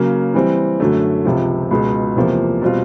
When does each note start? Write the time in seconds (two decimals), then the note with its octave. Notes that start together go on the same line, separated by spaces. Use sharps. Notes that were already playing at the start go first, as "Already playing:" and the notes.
Already playing: C#3 F#3 A#3
0.34 E3 G3 C4
0.80 F#2 D3 F#3 A3
1.25 C#2 C3 F3
1.71 C#2 B2 G#3
2.16 E2 C3 F3 A#3
2.62 B2 G3 C4 F4